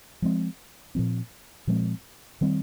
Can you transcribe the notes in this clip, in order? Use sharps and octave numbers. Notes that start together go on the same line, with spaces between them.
F3 G#3 C4
A#2 F3 C4
A#2 F3 G#3 C4
D#3 G3 C4